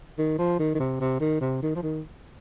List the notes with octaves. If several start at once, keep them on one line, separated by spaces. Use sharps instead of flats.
D#3
F3
D#3
D#3
C3
C3
D#3
C3
D#3
F3
D#3